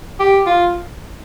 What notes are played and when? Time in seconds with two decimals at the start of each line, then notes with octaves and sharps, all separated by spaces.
0.20 G4
0.47 F4